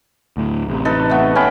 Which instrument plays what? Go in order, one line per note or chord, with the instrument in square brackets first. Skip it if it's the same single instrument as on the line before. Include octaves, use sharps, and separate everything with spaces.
[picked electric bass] D2 A2
A1 C3
[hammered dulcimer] D#4 A4 B4
A3 B3
C#4 G5 B5